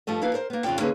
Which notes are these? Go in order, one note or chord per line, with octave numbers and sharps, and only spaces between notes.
G2 F3 G3 A3 D#5
F3 A#3 E4 B4 F5
A#4 C5
A#3 B3
F2 C#3 F4 D5 G5
D3 A#3 C#4 E4 G#4 B4